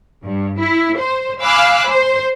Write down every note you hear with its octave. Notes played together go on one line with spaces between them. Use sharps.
G2
E4
C5
F5 G#5 B5 D6 E6 F#6
C5